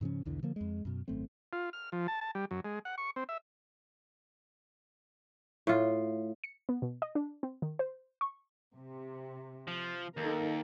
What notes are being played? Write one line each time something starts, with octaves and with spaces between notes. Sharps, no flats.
G#2 C#3 F3 C#4
B1 E2 D3 E3
D3 F3 A#3
F2 G#3
F#2 B2
G#1 F#2 A3 C4
F4
F6
F3
A5
A5
G3
F#2
G#3
F#5
C#6
C4
E5
A2 F4
C#7
B3
B2
D#5
D4
C4
D#3
C5
C#6
C3
F3
D#2 D#4 A4 A#4